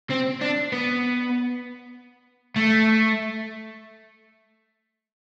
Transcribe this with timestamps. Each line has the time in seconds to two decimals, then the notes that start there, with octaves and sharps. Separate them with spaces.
0.11 C4
0.42 D4
0.72 B3
2.56 A3